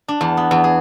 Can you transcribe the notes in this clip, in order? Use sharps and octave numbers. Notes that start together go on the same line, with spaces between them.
D4
E2
B3
E2
G#4